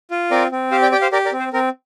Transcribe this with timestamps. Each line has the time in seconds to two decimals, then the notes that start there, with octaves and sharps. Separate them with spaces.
0.11 F4
0.31 C4 A#4 D5
0.52 C4
0.71 G4 C5 F5
0.82 D5 G5
0.92 G4 D5 G5
1.02 C5 F5
1.12 G4 A#4 D5
1.26 A#4 D5
1.32 C4
1.39 C5
1.53 C4 A#4